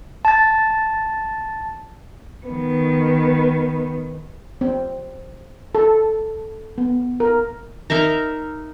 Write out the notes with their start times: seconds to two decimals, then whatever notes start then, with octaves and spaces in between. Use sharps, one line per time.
0.25 A5 A6
2.48 D#3 B3
4.61 C4
5.75 A4
6.78 B3
7.20 A#4
7.90 D#4 A#4 E5 A#5